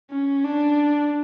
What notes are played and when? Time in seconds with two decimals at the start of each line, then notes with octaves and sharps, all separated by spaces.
0.11 C#4
0.45 D4